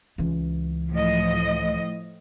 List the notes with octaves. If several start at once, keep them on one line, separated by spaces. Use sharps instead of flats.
C#2 E3
A2 F3 D#5